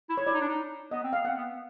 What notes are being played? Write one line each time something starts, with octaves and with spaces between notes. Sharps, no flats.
E4
C#5
E4 D5
D#4
D4
D#4
B3 D#5
C4
B3 F5
C4 F#5
B3